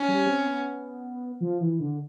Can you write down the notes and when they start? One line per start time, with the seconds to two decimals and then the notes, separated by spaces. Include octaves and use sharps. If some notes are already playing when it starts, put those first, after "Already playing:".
Already playing: C#4
0.08 G3
0.27 C4
0.46 B3
1.40 F3
1.60 E3
1.80 D3